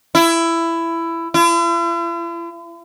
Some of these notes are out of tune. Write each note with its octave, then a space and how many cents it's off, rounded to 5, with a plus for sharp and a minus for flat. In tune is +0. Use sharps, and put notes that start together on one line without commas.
E4 +15
E4 +45